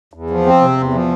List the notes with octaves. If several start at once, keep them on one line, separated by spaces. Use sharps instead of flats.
E2
F3
C4
C3
E2
F3